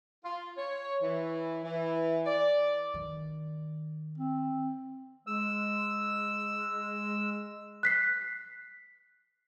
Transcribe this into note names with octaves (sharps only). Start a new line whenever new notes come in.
F4
C#5
E3
E3
D5
D#3
C4
G#3 E6
F#6 B6 C7